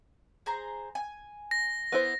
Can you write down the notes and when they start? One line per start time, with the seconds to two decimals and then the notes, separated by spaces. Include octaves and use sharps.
0.46 G#4 C5 A#5
0.95 G#5
1.51 A#6
1.92 B3 E4 C5